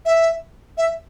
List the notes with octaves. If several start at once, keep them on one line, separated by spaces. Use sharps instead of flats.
E5
E5